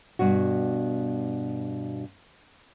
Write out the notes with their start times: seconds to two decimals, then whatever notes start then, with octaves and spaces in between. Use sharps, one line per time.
0.19 G2 B2 F#4